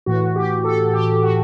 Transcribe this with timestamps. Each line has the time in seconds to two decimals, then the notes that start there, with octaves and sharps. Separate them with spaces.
0.06 A2 E3 F#4
0.36 G4
0.64 A4
0.93 G4
1.22 F#4